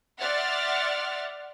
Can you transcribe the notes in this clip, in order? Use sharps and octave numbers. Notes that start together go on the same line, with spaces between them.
D5 E5 F#5 C6 F6 A6